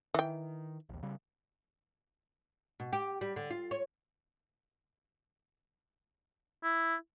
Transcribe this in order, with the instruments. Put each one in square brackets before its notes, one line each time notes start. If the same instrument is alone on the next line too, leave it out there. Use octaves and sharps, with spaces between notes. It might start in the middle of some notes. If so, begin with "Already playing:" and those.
[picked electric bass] D#3 [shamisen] E3 G5
[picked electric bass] A#1 D#2
C#3 G3
[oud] B2
G4
G3
D3
F4
C#5
[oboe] E4